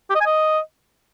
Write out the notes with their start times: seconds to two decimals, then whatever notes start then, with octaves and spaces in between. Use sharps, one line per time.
0.10 G4
0.15 D#5
0.21 G#5
0.26 D#5